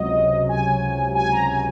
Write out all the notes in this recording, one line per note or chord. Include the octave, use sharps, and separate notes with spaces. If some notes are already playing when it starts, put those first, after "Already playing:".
Already playing: C#2 C3 F#3 D#5
G#5
G#5
A#5
G#5